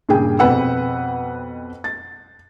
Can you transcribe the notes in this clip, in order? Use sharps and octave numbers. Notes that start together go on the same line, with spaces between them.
G2 A#2 C#3 G#4 G5
F2 B2 C4 B4 F#5 E6
A6